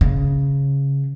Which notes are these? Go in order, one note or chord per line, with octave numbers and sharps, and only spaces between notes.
C#3